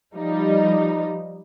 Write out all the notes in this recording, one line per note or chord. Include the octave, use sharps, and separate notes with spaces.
F3 G3 D#4